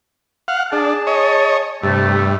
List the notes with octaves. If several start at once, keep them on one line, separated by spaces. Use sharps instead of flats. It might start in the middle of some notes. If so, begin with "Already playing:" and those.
F5 F#5
D4 G#4 A5
C#5 D#5
G2 C3 A3